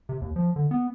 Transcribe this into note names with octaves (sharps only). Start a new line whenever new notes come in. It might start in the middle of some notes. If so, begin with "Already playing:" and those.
C3
D#2
F3
D3
B3